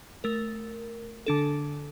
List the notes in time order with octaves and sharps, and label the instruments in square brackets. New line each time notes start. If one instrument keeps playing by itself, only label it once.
[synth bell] A3 A#4
D3 D4 A4